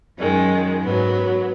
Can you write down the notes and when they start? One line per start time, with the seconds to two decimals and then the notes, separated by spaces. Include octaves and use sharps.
0.19 F#2 D#3 G#3
0.82 G#2 F#3 B3